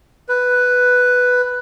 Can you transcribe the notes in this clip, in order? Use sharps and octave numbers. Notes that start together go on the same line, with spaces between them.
B4